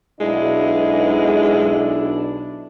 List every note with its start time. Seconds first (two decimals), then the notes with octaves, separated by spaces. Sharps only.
0.20 B1 B2 G#3 D4 E4